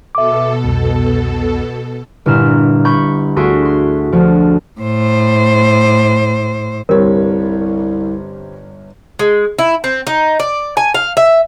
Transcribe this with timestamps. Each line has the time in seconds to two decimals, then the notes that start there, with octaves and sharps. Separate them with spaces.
0.15 B2 A4 E5 D6
0.64 C2 F2
2.26 G1 A#2 E4 F6 E7
2.85 B5 C#6 G6
3.36 D2 F#4 G#4 E5 C6 D7
3.65 C6
4.12 D2 F3
4.80 A2 C5
6.89 G1 C2 C3 G3 C4 A#4 C#5
9.19 G#3
9.59 E4
9.84 C4
10.07 D#4
10.40 D5
10.77 G#5
10.94 F5
11.17 E5